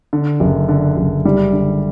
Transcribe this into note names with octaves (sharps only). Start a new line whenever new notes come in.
D3
F#1
D3
F#1
G3
D3